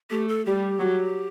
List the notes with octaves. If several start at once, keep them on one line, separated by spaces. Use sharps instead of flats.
A3 G4
A4
G3 G4
F#3